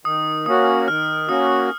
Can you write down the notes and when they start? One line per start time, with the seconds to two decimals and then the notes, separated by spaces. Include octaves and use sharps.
0.05 D#3 D#6
0.46 A#3 C#4 F#4 D#6
0.88 D#3 F6
1.28 A#3 C#4 F#4 D#6